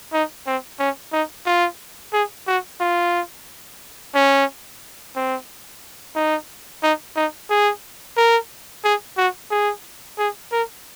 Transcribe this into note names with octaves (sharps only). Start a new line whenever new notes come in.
D#4
C4
C#4
D#4
F4
G#4
F#4
F4
C#4
C4
D#4
D#4
D#4
G#4
A#4
G#4
F#4
G#4
G#4
A#4